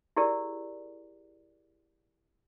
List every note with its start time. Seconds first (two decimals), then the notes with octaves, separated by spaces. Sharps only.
0.17 E4 G4 G#4 A#4 D5